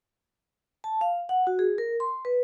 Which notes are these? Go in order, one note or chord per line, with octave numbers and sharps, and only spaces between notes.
A5
F5
F#5
F#4
G#4
A#4
C6
B4